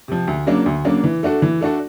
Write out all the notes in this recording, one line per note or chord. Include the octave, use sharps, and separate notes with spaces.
C3 F3
D2
C#3 F#3 A#3 D4
D2
C#3 F#3 A#3 D4
E3
A3 D4 F#4 A4
E3
A3 D4 F#4 A4